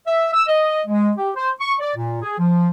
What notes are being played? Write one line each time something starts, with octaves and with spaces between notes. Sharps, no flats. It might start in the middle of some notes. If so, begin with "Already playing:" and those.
E5
E6
D#5
G#3
G4
C5
C#6
D5
A#2
G#4
F3